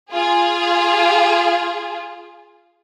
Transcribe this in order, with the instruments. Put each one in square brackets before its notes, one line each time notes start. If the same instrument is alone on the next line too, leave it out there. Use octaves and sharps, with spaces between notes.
[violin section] F4 G#4